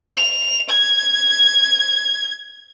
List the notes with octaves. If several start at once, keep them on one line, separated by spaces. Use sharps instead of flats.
F7
G#6